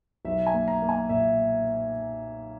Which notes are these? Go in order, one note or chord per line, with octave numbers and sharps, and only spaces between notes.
B1 E5
G#5
A#3
A#5
A#3
G#5
A#2 E5